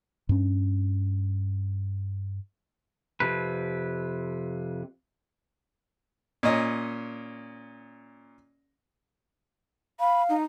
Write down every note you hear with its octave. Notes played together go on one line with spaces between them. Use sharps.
G2 C#4
F2 C3 B4
A#2 C#4 D#5
F5 B5
D#4